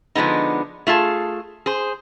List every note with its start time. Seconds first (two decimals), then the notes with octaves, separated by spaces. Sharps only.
0.15 D3 F3 G#3 B3 D#4
0.87 A3 F4 G#4 A5
1.66 G#4 C5